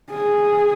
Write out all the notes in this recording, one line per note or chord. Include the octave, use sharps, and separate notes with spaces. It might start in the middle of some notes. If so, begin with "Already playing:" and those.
G#4